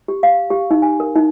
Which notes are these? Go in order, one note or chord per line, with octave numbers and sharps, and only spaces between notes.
G4
F5
G4
D#4
G#5
A#4
D#4